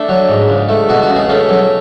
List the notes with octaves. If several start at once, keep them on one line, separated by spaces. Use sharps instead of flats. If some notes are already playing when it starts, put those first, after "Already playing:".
Already playing: A3 D4
F#3
G#2
C#2
A3
B2 F#4
F#4
C#2
G#4
A3 C#4
F#3